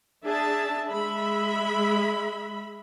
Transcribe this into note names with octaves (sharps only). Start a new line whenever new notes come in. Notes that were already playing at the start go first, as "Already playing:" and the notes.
D4 G#4 E5 A5
G#3 E5 B5